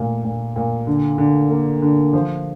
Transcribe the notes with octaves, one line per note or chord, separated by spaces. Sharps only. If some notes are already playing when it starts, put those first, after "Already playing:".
Already playing: A#2 A3
A#2
A#2
D3
D3
A#3
D3
F3